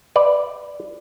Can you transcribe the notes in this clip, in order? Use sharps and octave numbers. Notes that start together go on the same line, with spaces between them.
B4 D5